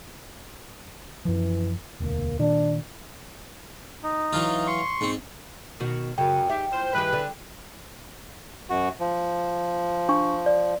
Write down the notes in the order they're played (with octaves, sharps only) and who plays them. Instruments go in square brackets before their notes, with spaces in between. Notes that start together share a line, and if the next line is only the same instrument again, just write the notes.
[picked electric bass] F#2 F3 [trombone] E3
[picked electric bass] E1 D2 [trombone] A#3
[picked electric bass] A#2 D#3 [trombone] D4
[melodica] D#4
[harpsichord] E3 F#3 F4
[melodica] C6 C#6
[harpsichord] G#2 C4
[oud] B2 D#3 F#4
[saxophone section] F#2 [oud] C#3 [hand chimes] G5
[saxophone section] G#2 G4 [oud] E5
[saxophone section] A2 F4 C5
[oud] G2 D#3 G4 [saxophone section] E4 G#4 B4
[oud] D3
[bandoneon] F#2 F#4
F3
[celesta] D4 C#6
D5